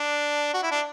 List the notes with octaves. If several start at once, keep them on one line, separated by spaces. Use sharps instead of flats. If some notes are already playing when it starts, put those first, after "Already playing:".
Already playing: D4
F#4
E4
D4